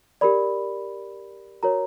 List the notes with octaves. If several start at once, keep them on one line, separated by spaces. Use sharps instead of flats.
G4 A#4 D5 B5
F#4 A#4 C#5 A#5